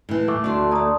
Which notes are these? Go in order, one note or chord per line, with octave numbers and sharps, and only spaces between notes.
A2 E3
A3 C#6 D6
D2 D4 F#4 A5 C6
D5 A5 A#5 C#6 D#6